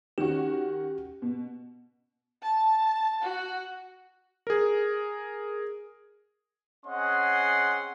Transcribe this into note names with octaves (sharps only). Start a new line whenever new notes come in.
D#3 C#4 F#4 G4
B2
A5
F#4
G#4 A#4
C4 C#4 G#4 D#5 F#5 C6